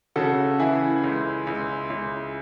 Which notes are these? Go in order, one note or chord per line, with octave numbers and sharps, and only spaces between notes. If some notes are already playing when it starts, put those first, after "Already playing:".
C#3 F#4 A4
E3 E4 G#4
C#2
C#2
C#2